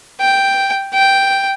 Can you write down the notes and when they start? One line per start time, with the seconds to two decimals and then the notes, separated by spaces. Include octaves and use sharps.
0.20 G5
0.94 G5